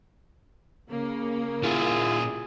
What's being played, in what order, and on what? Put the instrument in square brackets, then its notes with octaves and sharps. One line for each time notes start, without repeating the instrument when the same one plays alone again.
[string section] C#3 A#3
[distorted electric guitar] A#2 G4 [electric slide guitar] E4 F4 [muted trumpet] G#4